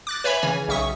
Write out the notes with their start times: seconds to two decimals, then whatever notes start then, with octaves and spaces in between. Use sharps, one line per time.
0.07 D6 F#6 A6
0.24 B4 C#5 E5 G#5 B5
0.42 C#3 E3 C#5 G#5
0.68 B1 C#3 E5 C#6 D#6